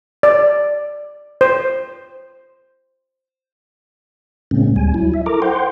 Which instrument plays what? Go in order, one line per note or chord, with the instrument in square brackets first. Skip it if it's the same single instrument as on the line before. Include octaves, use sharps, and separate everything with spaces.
[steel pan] D5
C5
[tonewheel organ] A2 C#3 G#3 A#3 C4 C#4
D2 G3 G#5
F#3 E4
E5
E4 A4 A#4 A#5 D6
C5 F#5 G5 C6